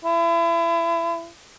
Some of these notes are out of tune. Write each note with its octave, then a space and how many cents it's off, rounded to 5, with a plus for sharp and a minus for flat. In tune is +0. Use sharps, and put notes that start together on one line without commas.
E4 +35